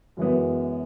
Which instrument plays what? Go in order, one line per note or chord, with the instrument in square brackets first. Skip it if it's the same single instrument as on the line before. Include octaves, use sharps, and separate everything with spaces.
[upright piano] F#2 E3 G#3 B3